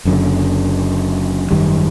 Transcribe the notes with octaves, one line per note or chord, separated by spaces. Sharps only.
F#1 F#2 D3 F#3
G#1 F#2 D#3 G3